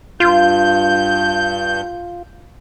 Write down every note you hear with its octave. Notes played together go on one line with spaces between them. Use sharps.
G2 F4 G6